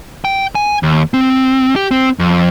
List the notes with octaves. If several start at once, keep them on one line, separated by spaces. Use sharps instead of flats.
G5
G#5
D#2
C4
G4
C4
F2